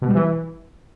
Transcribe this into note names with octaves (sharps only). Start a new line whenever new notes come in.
B2
G3
E3